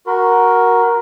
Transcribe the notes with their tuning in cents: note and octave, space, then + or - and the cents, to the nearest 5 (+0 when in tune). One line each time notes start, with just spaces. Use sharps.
F#4 +0 A#4 +10 B5 +45